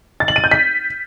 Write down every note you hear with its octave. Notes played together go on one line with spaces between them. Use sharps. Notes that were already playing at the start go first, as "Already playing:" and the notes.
A6
F#7
D#7
G6
B6